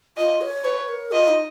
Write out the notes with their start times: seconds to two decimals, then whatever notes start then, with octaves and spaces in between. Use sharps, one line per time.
0.17 F4 D#5
0.41 C#5
0.64 B4 C#5
0.88 A#4
1.12 F4 D#5
1.28 D#4